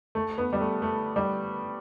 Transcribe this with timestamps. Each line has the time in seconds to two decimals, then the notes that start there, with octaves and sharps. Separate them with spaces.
0.15 A3
0.38 B3
0.53 G3
0.61 A3
0.82 A3
1.16 G3